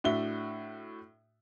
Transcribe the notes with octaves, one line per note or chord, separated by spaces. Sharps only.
A2 D4 F#4 E5 G7